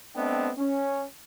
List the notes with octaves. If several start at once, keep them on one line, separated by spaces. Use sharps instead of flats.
A3 B3 C4 D4 D#5 G5
C#4